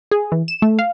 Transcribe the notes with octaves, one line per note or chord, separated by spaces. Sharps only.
G#4
E3
E7
A3
F5